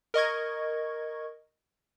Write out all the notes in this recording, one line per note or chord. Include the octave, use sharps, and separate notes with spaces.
A#4 D#5 C#6 G#6